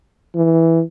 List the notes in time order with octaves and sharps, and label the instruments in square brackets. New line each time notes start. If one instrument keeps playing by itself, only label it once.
[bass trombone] E3